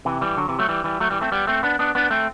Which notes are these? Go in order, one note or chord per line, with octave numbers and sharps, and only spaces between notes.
C3 E3
E3 G3
D3 F#3
C3 E3
F#3 A3
E3 G3
E3 G3
F#3 A3
E3 G3
A3 C4
G3 B3
A3 C4
B3 D4
B3 D4
B3 D4
A3 C4